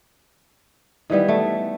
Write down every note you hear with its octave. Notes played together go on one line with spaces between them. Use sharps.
D#3 E3 G3 B3
A3